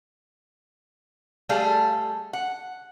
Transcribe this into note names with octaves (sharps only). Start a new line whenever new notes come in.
G3 A3 G#4 A4 D5 F5
F#5